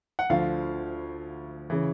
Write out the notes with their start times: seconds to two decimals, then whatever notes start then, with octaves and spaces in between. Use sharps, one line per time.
0.19 F#5
0.29 D2 D3 F3 F5
1.70 C#3 E3